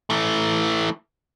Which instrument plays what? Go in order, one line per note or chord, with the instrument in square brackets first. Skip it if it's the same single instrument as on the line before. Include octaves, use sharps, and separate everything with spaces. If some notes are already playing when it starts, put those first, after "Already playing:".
[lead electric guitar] E3 A3